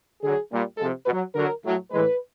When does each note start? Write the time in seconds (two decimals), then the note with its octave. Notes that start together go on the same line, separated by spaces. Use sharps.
0.22 D3 F#3 G#4
0.50 A#2 G3
0.78 C3 F3 G#3 A4
1.06 B2 B4
1.11 F#3
1.34 D3 F#3 A#4
1.64 A2 F#3
1.91 A2 E3 G#3 B4